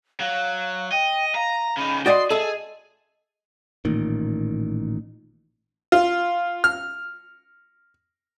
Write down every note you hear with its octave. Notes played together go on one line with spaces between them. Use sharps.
F#3 F5
D#5 G5
F5 A#5
C#3 D#4 B5
F#4 D5 D#5 G5 C6 D#6
G#4 A4 D#5 E5
A1 A#2 D#3
F4
F6